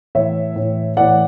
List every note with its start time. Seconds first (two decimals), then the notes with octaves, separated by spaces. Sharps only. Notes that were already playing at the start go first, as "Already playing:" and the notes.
0.15 A2 E3 C#5 E5
0.56 A2 E3
0.97 A2 E3 D5 F#5